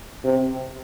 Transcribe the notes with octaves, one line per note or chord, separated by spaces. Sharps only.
C3